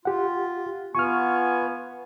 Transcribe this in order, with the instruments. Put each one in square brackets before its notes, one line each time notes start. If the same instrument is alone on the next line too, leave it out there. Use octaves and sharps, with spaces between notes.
[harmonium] F4 [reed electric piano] G4 F#5
[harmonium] B3 [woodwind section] F4 G#5 [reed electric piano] C#6 F6